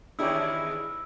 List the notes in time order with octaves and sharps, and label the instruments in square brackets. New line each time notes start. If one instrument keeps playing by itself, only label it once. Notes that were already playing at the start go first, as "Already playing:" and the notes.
[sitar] E2 D#3 G#4 [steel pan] D4 G4 C#5 [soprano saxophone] E4 [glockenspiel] E6